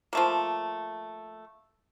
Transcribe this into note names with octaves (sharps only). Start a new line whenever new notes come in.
F3 A3 A#3